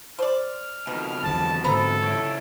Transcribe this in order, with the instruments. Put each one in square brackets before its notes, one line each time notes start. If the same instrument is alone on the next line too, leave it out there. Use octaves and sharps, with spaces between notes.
[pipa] C5 D5 [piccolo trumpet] F6
[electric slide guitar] F2 B2 [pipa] D#3
[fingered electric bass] E2 D3 F#3 [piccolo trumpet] A5
[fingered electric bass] G#2 D3 C4 [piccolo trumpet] A4 [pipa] B4 C5 A#5
[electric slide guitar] C#3 E4 C#5